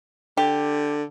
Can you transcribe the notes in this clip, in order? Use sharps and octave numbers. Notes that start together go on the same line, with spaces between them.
D3 G4